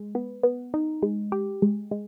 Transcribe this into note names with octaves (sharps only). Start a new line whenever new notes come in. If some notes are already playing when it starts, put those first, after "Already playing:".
Already playing: G#3
B3
B3
D#4
G#3
G4
G#3
G#3